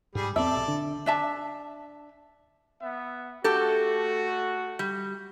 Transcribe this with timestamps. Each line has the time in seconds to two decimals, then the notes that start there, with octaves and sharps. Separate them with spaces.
0.15 G#2 G3 G#4
0.36 E2 C4 A4 D5 E5
0.56 B1
0.68 D3
1.06 D4 E5 A5
2.80 B3 E5
3.44 A3 F#4 G4 A4
4.79 G3